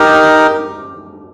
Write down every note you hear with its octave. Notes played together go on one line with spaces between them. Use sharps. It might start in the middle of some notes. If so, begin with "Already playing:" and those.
Already playing: D#4 G4 A#4 D6